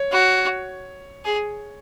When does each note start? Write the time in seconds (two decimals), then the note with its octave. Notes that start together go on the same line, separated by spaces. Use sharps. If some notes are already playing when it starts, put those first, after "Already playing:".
Already playing: C#5
0.12 F#4
1.24 G#4